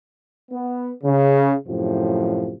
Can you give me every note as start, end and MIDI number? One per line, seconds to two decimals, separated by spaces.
0.51 0.91 59
1.03 1.55 49
1.67 2.53 42
1.67 2.53 45
1.67 2.53 48
1.67 2.53 53